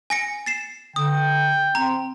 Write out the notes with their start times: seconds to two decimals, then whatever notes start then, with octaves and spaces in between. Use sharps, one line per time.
0.10 G#5 A#6 C#7
0.46 A6 C7 E7
0.96 D3 G5 D#6
1.75 C4 A#5